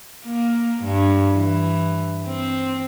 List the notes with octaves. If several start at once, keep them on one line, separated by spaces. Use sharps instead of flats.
A#3
G2
E3
C4